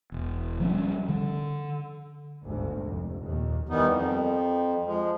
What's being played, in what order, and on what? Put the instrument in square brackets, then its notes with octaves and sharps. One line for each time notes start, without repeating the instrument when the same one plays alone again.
[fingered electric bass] E1
F3 G3 A#3 C#4
D3
[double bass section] G1 D2 G#2
F1
D#2 A#2
[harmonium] D#3 E3 G3 B3 D#4
F2
F3 G#3